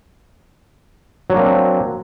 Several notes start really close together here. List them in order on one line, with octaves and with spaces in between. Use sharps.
F#3 D4 A#3 C4